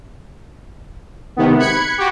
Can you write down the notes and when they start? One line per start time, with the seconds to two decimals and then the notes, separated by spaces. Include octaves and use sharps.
1.36 G#2 C3 D#3 B3
1.58 B5 F#6 G#6 C#7
1.98 F#4 G4